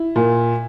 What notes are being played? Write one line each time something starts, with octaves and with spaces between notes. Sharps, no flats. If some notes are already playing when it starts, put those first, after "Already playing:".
Already playing: E4
A#2